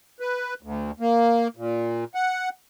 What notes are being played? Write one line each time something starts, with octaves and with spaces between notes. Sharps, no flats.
B4
D2
A#3
A#2
F#5